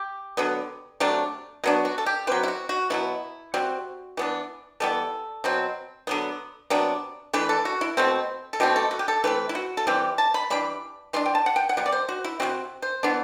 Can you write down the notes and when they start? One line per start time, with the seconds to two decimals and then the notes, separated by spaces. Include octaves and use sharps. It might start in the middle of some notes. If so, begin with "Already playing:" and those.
Already playing: G4
0.37 D3 F#3 B3
1.00 C3 F#3 A3 D4
1.64 F#3 B3 D4 F#4
1.85 F#4
1.98 A4
2.06 G4
2.27 F#3 C4 B4
2.43 E4
2.48 F#4
2.69 F#4
2.90 B2 F#3 B3 E4
3.54 C3 G3 C4 F#4
4.17 E3 B3 D4
4.80 E3 G3 B3 A4
5.44 B2 F#3 C4
6.07 D3 F#3 B3
6.70 C3 F#3 B3 D4
7.33 E3 A3 D4 B4
7.49 A4
7.65 F#4
7.81 E4
7.97 B2 A3 C4
8.53 A4
8.60 B2 A3 C4 G4
8.76 A4
8.91 F#4
8.99 G4
9.08 A4
9.24 E3 A3 C4 B4
9.49 E4
9.55 F#4
9.77 A4
9.87 E3 G3 C4 G4
10.18 A5
10.34 B5
10.50 E3 G3 D4 B5
11.13 E3 A3 D4 C6
11.26 G5
11.35 A5
11.46 F#5
11.56 G5
11.69 F#5
11.77 C3 G3
11.86 D5
11.92 C5
12.09 F#4
12.24 E4
12.40 C3 G3 C4 F#4
12.82 C5
13.03 E3 B3 D4